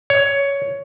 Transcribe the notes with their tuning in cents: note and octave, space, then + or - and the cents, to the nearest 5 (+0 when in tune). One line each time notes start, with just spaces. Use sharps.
C#5 +10